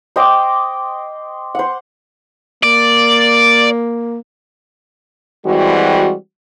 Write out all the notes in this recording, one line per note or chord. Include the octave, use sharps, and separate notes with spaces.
C5 D#5 G5 D6
C5 F#5
A#3 D5
E3 G3 G#3 C4 F#4